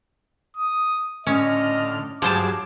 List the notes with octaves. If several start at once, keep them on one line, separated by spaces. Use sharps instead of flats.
D#6
A2 D3 C#4 D#5 F6
G2 F3 F#3 G#4 C5 A5 D6